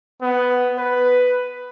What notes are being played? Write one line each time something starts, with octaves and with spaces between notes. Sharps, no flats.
B3
B4